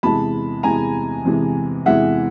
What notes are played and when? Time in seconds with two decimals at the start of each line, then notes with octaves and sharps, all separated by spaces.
0.03 E2 C3 E3 G#3 A5 B5
0.63 E2 C3 E3 G#3 G#5 A#5
1.25 E2 C3 E3 G#3
1.86 E2 C3 E3 G#3 E5 F#5